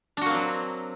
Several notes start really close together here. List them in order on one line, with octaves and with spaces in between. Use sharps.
D4 F#4 A#3 C4 F#3